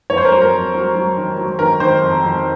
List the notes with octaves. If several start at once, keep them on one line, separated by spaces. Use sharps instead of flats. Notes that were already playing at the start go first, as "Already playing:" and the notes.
F2 C#5
C5
A#4
F#3 C5
A#4
F2
F#3
F#3
D#3
F#3
D#3 A#4
D#3 C5
F2
F2